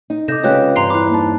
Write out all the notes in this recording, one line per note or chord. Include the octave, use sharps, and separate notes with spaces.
D#4
C3 A4 D#5 D6 G6 A#6 E7
C#3 G#3 F4 G4 B4 C#5 F5 F#6
E2 G2 C4 A#5 C6 C7
E4 B5 D6 F#6
A#3 D#4 A5